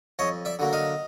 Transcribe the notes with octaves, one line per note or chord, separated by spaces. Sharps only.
F2 C#5 D#5
D5 E5
D3 F#3 A#3
D#5 F5